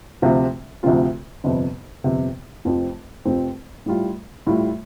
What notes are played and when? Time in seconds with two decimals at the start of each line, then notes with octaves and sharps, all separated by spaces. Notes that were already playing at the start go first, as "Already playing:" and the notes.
0.22 D2 C3 F3 C4 F4
0.83 D2 C3 F3 C4 F4
1.44 G1 F2 C3
2.04 G1 F2 C3
2.65 F1 F2 F3 C4
3.25 F1 F2 F3 C4
3.86 A2 G3 F4
4.47 A2 G3 F4